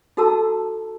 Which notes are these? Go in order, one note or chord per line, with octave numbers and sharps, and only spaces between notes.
D#4 F#4 A4 A5 A#5 E6